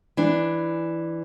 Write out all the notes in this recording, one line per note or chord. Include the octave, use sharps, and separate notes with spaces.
E3 D4